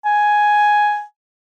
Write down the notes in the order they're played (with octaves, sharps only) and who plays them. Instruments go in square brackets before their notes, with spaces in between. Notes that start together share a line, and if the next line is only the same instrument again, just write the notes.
[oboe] G#5